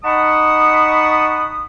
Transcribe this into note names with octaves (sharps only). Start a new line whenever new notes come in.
D#4 F#5 A5 B5 C#6 D#6